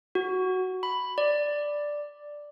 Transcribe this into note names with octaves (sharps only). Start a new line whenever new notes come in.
F#4
B5
D5